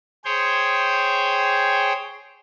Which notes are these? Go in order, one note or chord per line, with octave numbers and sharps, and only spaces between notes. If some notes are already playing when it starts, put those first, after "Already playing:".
G#4 C5 C#5 G5